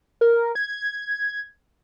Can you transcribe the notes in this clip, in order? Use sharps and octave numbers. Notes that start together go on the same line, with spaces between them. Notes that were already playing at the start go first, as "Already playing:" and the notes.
A#4
G#6